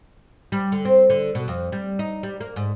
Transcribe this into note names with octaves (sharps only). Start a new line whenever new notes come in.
G3
D3
C4
D3
B2
F2
G3
D#4
G3
A#3
G#2